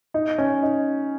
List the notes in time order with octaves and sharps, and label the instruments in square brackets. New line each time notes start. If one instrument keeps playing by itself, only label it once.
[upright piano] D#4
C#4
D#4